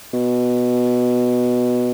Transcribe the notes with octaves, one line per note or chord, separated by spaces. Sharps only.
B2